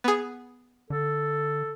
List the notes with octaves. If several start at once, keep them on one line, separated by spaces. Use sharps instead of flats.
B3 G#4
D3 A4